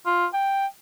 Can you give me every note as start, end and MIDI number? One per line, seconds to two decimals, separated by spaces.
0.06 0.26 65
0.34 0.66 79